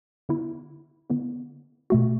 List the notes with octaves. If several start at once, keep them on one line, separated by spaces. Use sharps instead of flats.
D3 B3 E4
D3 B3 E4
B2 A3 F#4